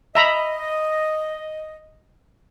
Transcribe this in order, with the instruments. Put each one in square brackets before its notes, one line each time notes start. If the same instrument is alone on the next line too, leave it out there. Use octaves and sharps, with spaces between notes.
[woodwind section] D#5 [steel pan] E5 A#5 B5